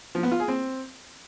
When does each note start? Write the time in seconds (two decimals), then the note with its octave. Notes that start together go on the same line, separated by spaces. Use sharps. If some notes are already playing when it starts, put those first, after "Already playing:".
0.15 F3
0.23 B3
0.32 F4
0.40 G#4
0.48 C4